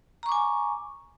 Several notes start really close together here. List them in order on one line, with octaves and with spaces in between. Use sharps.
A#5 C#6 D6 G#5